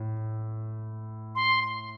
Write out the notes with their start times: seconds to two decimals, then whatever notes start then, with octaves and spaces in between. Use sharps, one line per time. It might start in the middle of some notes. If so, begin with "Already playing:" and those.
Already playing: A2
1.35 C6